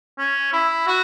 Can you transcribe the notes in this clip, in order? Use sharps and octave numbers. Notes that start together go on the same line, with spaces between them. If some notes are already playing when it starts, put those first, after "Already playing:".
C#4
E4
F#4